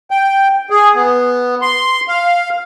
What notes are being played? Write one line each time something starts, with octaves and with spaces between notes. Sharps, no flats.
G5
G#4
B3
C6
F5